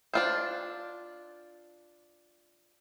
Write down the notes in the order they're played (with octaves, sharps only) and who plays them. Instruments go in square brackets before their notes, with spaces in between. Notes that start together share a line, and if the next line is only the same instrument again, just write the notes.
[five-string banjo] D4 F4 C5